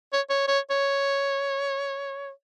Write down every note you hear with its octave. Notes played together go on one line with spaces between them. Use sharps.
C#5
C#5
C#5
C#5